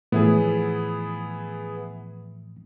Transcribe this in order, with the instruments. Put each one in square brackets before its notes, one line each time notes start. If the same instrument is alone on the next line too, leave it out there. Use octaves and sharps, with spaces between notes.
[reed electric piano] A2 E3 F3 [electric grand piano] B3 E4 G#4